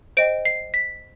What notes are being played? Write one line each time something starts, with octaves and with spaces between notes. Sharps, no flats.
C5 D#5 G5 D7
C7
B6